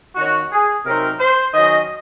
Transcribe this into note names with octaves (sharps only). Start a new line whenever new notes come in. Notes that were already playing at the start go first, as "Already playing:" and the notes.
D#3 A#3 C#4 F#4
G#4
C3 F#3 C4 D#4 A#4
C5
D#3 F#3 C#4 D#5